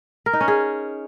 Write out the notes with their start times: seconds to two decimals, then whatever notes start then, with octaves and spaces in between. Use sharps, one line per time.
0.26 A#4
0.33 D#4
0.41 C#4
0.48 G#4